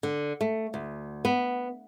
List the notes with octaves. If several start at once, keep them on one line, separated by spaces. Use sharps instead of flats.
D3
A3
D2
B3